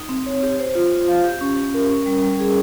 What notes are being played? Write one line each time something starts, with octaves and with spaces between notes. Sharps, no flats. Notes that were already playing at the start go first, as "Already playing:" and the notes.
Already playing: D#4
C4
C#5
G4
C5
F4
F4
F5
G4
C#4
C#4
A#4
C#4
G3
G3
G#4